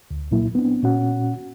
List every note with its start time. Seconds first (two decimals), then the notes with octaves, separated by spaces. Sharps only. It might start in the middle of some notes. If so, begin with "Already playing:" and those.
0.11 D2
0.31 C2 A#2 F#3 A#3 E4
0.55 B3 C4 D4
0.83 A#2 C#4 F#4 F#5